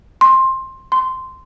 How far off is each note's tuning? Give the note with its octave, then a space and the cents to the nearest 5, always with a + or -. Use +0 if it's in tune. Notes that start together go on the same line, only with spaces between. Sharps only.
C6 +15
C6 -10